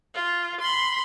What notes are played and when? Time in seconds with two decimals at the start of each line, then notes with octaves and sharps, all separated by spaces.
0.14 F4
0.60 B5 C6